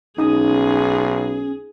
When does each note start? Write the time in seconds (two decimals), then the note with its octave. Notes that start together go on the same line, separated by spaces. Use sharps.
0.18 B1 C#4 D#4 G#4 D#6